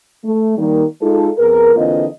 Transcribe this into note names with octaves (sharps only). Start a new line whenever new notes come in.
A3
D#3 G3 A#3
G#3 D#4 F4 A4
F2 B3 G#4 A#4
D3 E3 A#3 C4 F4 D#5